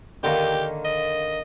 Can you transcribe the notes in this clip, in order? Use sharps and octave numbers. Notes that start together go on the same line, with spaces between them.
D3 D#3 A#3 G4
D#5